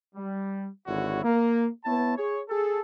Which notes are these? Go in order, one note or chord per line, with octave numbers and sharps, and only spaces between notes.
G3
G#1 D3 E4 F#4 C#5
A#3
B3 E4 C#5 A5
G#4 C#5
G#4 A4